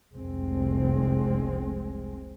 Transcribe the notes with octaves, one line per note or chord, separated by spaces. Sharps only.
F1 C2 G#3 C4